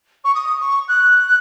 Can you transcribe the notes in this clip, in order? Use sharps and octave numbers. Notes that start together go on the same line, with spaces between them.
C#6
D#6
C#6
F#6